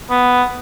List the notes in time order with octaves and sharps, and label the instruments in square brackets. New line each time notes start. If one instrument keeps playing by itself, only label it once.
[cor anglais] B3